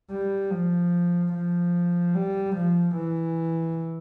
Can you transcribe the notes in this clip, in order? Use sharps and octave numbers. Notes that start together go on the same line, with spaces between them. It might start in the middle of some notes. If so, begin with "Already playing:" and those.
G3
F3
F3
G3
F3
E3